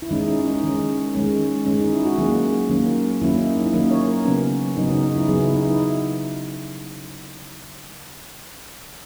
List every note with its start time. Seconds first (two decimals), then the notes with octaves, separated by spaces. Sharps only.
0.02 E4
0.11 D#3 G#3 C#4 D#4
0.29 C#4
0.45 D#4
0.63 D#3 G#3 C#4
1.15 D#3 G#3 C#4
1.66 D#3 G#3 C#4
1.79 D#4
1.92 E4
2.05 F#4
2.18 D#3 F#3 A#3 C#4 G#4
2.70 D#3 F#3 A#3 C#4
3.21 D#3 F#3 A#3 C#4 E4
3.38 D#4
3.57 C#4
3.66 E4
3.73 D#3 F#3 A#3 C#4 D#4
3.91 C#5
4.08 A#4
4.25 C#3 F#3 B3 C#4
4.77 C#3 F#3 B3 D#4
4.89 C#4
5.02 D#4
5.16 E4
5.28 C#3 F#3 B3 G#4
5.42 E4
5.54 D#4
5.67 E4